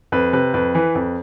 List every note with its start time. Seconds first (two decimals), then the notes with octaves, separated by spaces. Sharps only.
0.12 F2 B4
0.33 C3 B4
0.54 F2 B4
0.74 E3 B4
0.95 F2